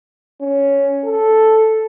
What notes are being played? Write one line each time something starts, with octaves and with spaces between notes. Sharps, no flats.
C#4
A4